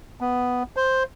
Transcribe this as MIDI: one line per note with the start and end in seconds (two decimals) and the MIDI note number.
0.21 0.63 59
0.77 1.03 72